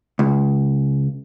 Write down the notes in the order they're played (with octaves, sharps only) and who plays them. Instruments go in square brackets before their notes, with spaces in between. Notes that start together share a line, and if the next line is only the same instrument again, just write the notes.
[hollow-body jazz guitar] C#2